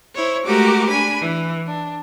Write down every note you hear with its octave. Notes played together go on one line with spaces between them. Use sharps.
E4 C5 C#5
G#3 A3 F#4 G4 A#4 D6
D4 G#5 B5
E3
D4